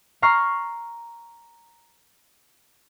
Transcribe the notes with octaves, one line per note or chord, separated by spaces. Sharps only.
A#5 C#6 F6 C7